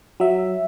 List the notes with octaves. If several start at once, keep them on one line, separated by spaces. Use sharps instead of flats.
F#3 E5